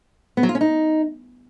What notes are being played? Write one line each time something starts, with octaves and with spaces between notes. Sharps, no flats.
B3
F#3
F4
C#4
D#4